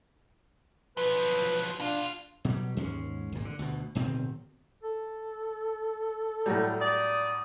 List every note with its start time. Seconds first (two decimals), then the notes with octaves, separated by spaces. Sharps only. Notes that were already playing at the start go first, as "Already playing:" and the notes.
0.97 F3 F#3 B4
1.80 B2 D4 F4
2.45 B2 F#3 G3
2.77 D#2 G#2 G#3 C#4
3.32 G#1 A#2
3.45 D3
3.59 D2 B2
3.95 D1 B2 D#3 C4
4.83 A4
6.46 A2 F#3 G3
6.81 D5 D#6